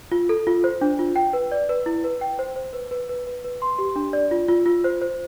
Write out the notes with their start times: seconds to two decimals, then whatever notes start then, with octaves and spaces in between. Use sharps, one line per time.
0.12 F4
0.29 A4
0.47 F4
0.64 C5
0.81 D4
0.99 F4
1.16 G5
1.33 B4
1.52 D5
1.69 B4
1.86 E4
2.04 B4
2.21 G5
2.39 C5
2.56 C5
2.73 B4
2.91 B4
3.09 B4
3.27 B4
3.44 B4
3.62 C6
3.79 G4
3.96 D4
4.13 D5
4.31 F4
4.48 F4
4.66 F4
4.84 C5
5.02 C5